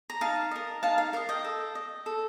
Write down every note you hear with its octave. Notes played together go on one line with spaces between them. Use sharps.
A#5
D#4 F5 A5
A#4 D#5
D#4 F5 A5
F5
A#4 D#5 F5
D#5 G5
A4
D#5
A4